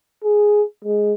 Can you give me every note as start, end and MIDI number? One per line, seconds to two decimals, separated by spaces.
0.24 0.62 68
0.85 1.13 56